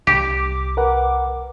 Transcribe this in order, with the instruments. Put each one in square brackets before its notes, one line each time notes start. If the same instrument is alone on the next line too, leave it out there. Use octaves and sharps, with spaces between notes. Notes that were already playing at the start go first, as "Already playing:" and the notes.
[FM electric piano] C2 D6 [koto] G4
[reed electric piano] A#4 B4 F#5